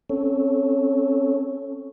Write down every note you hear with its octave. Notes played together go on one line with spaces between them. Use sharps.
C4 C#4 A4 C#5